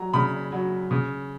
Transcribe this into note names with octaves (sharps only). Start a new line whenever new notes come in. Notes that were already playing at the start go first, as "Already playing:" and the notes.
Already playing: F#3 A#5
C#3 B5
F#3
C#3